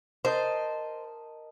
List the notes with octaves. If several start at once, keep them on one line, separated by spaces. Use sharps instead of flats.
A#4 C5 D#5 A5